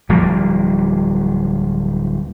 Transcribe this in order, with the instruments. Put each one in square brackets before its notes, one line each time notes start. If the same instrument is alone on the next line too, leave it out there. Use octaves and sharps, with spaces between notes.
[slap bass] D1 F3 G3 A#3